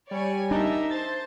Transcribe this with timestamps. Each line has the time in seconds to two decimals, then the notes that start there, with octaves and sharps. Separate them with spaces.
0.11 G3 C#5 D5 G#5
0.51 D4 D#4 A#4 E5
0.91 C5 A5 A6